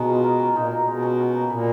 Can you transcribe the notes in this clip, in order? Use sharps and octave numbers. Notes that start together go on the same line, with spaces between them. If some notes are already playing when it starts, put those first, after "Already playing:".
Already playing: B2 G#3 B3 D#4
F4
A#4
C#4
A#2 D#4
B2 A#4
B2 G#3
C#4
F#4
A#3
A#2 B4